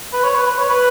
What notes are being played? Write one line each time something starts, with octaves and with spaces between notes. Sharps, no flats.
B4
C#5
B4
B4
C#5
B4